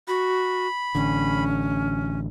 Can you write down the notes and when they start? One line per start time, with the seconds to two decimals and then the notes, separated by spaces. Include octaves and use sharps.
0.08 F#4 B5
0.95 A1 D3 C#4